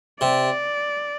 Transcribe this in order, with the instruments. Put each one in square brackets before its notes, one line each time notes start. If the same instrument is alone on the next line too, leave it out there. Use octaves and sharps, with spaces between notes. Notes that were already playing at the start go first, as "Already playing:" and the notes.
[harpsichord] C3 [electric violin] D5